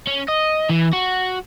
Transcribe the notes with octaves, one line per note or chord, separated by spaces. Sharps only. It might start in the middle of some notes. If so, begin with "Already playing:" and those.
C#4
D#5
E3
F#4